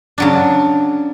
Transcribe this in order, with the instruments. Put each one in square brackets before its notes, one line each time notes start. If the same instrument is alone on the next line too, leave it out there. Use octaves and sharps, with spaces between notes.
[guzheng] C#3 F#3 D4